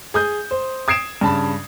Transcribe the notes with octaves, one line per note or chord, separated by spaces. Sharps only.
G#4 D#6 G6
C5
D#6 G#6 C7 D7 E7
G2 C#3 A5 B5